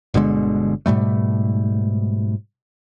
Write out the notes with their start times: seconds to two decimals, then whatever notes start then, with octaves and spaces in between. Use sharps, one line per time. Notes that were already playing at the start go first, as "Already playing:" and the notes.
0.14 G1 B2 D3 G#3
0.86 G#2 B2 G3 A3